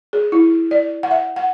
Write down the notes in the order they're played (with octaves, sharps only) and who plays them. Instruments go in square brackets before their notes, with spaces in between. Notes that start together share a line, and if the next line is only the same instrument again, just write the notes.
[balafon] G#4
E4
D5
F#5
E5
F#5